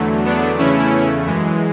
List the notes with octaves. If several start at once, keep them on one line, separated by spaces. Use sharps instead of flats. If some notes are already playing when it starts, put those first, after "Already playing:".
Already playing: E2 D3 F#3 A3
B3 D4
E2 C#3 E3 A3 C#4 E4
F#2 E3 G#3